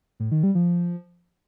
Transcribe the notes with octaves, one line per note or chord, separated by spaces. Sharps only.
A2
D#3
G3
F3